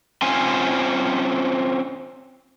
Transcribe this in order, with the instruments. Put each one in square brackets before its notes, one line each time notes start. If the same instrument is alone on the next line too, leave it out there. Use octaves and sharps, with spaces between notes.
[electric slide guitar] C4 C#4 F4 C5 G#5